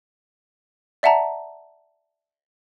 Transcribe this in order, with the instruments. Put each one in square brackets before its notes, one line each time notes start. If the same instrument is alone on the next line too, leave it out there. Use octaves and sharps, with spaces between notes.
[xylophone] D5 E5 F#5 A5 A#5